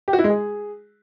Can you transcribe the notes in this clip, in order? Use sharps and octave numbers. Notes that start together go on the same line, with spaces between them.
G4
F#4
E4
G#3
G#4